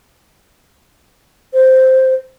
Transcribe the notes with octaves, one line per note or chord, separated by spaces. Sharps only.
C5